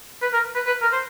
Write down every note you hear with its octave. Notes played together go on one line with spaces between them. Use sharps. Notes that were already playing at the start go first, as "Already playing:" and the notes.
B4
A#4
B4
B4
A#4
C5